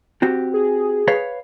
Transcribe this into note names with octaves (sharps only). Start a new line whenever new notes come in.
C4 F#4 G4
G#4
B4 C#5 F5